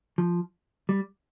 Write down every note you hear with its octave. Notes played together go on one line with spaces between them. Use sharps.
F3
G3